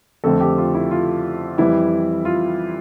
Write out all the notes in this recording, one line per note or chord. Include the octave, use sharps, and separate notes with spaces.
F2 D3 A3 C4 A4
G4
F4
E4
F4
F2 E3 G3 E4
F4